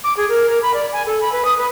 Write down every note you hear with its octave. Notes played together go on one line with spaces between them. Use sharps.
D6
G#4
A#4
A#4
B5
D5
G#5
A4
B5
B4
D#6
B4